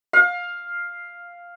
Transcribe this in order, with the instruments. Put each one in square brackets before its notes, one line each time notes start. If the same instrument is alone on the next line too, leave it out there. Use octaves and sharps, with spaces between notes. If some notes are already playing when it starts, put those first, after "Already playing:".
[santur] F5